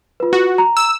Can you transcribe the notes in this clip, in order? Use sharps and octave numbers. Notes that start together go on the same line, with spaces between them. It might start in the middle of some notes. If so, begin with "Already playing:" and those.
F4 B4
F#4
A#5
E6